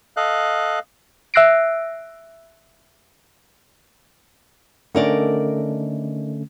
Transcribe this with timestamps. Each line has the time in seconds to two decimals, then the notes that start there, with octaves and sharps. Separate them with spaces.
0.17 A4 D#5 F5 F#6
1.34 E5 E6 F#6 A#6 C7 D7
4.95 D3 A3 C#4 D#4 A#4 D5